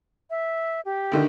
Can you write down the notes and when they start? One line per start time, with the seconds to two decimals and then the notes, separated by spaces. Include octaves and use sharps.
0.30 E5
0.85 G4
1.12 D2 D3 D#3